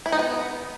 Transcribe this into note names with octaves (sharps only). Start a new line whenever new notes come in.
E4
D#4
B3